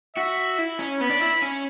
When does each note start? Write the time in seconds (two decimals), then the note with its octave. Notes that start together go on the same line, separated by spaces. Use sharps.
0.16 F#4 E5
0.58 E4
0.79 C#4
1.00 B3 B5
1.10 D4
1.21 E4
1.42 C#4